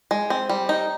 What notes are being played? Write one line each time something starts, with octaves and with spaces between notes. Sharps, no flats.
G#3
C4
G3
D#4